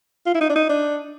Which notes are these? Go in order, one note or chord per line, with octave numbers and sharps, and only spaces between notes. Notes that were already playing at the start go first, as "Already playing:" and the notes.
F4
E4
D#4
D4
D#4
D4